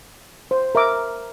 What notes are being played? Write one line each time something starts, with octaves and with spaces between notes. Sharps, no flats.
C5
A#4 E5 A#5 D6